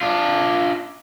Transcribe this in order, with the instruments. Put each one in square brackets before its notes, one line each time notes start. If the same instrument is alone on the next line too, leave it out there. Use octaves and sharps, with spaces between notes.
[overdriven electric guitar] D4 F4